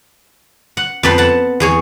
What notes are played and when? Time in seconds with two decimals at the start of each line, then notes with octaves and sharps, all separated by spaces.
0.77 F#5
1.03 F2 B3 A4 B4 G5 C6
1.18 F#5 A5
1.60 E2 G#4 C#5